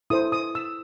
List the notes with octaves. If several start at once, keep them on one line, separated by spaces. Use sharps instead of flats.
E4 A4 C5 D#6
D#6
E6